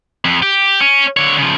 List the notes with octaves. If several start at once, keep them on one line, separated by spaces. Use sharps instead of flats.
F2
G4
C#4
D3 C#5
C#3 F3